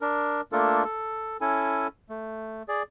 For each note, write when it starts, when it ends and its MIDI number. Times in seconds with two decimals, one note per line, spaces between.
0.01 0.41 62
0.01 0.41 70
0.52 0.84 57
0.52 0.84 58
0.52 0.84 62
0.52 0.84 65
0.52 0.84 69
0.52 0.84 70
0.84 1.37 69
1.41 1.87 61
1.41 1.87 64
1.41 1.87 69
1.41 1.87 80
2.09 2.63 57
2.68 2.83 68
2.68 2.83 74